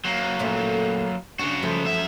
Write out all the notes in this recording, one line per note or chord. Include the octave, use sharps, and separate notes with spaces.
F#3 A#3
A#2 A3 C#4
C#3 D4 F#4
F3 G#3 A3
F#2 E5